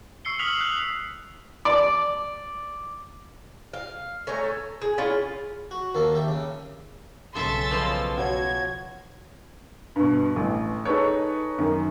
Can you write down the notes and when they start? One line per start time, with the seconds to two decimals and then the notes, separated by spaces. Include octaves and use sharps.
0.25 C#6 E6 C7 C#7 G7
0.39 D#6 F6 B6 F7 F#7
0.61 F#6 B6 F#7
1.65 D5
3.73 F5
4.27 A3 C#5 G#5 A#5
4.44 A4
4.82 G#4
4.98 C#4 E4 F4 G#4
5.71 F#4
5.95 D#2 A#3 A4
6.15 G4 E5
6.28 C#3
7.35 B1 C#3 A4 E5 C6 E6 A6
7.71 B2 F3
8.18 F#4 C#5 G#6
9.96 G2 B2
10.36 A1
10.85 D#4 G#4 A4 B4 C#5
11.58 F#2 D#3